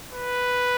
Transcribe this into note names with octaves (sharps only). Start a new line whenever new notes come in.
B4